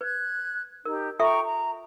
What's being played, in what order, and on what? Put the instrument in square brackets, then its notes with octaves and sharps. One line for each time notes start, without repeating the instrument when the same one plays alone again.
[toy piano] B4 [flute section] F#6 G#6
[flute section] D#4 G4 [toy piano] A#4
[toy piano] F4 A4 E5 [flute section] G5 A#5 C#6
[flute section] A#5